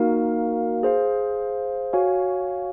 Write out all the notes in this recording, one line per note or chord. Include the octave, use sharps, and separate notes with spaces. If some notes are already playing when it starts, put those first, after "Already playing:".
Already playing: A#3 D#4 F#4 A#4 F5
G#4 C5 F5
F#4 C#5 F5 G#5